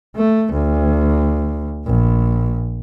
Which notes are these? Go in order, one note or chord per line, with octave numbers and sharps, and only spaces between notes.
A3
D2
A#1